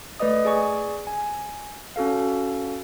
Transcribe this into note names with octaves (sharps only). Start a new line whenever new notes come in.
A3 B4 D5 D#5 D#6
G#4 D5 G#5 C#6
G#5
C#4 F#4 A4 F5